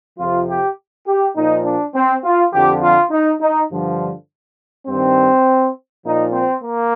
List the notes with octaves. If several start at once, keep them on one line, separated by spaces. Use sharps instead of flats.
F2 C3 F3 F4
G4
G4
A#2 F3 D#4
D4
C4
F4
F2 D3 F3 G4
F4
D#4
D#4
G2 D3 F3
G2 D#3 C4
A#2 F3 D#4
C4
A#3